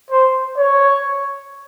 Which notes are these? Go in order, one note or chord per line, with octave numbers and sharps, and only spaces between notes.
C5
C#5